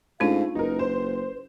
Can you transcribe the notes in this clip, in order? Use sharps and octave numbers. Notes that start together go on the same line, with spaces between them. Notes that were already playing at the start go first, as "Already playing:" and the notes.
G#2 A3 C#4 D4 F4 F5
F#1 D#4 A#4 B4
C5